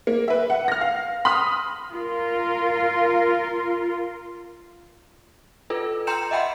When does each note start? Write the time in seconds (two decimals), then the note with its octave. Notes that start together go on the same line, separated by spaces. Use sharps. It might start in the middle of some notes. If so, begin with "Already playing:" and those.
0.07 A#3
0.28 B4 E5
0.50 F#5
0.68 F6 A#6
0.81 F5
1.25 B5 C6 D#6 F6
1.92 F4 A#4
5.70 F4 A4 B4
6.07 G5 A#5 C6 G6 C#7 E7
6.31 D#5 E5 F#5 G5 B5 C6